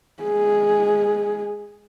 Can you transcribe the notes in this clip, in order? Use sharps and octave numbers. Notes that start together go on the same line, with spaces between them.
G#3 G#4